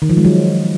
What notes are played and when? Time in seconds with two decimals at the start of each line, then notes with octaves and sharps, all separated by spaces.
0.02 D#3
0.09 F3
0.17 G#3
0.25 F#3